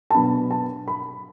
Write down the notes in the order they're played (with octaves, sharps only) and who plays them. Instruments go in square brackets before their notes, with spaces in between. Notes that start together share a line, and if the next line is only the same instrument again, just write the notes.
[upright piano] A5
B2 F#3 B3 D4 B5
A5
B5